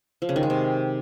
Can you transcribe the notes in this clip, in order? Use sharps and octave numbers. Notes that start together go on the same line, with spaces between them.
F3
C#3
D#3
G#3
C3